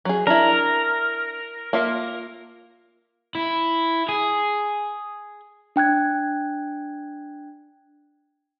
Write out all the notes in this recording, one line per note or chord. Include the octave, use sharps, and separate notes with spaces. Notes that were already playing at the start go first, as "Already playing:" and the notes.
F#3 G#4
D4 E4 A#4
A#3 F4 E5
E4
G#4
D4 G5 F#6 G#6